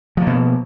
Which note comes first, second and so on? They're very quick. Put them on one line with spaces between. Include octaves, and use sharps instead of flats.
F3 A#3 B2